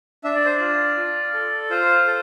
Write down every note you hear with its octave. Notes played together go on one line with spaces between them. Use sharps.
D4 E5
D5
C5
F4 D5
F4
A4
F4 C5
A4